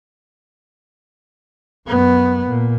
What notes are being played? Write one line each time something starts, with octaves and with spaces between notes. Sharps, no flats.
F#2 B3
A#2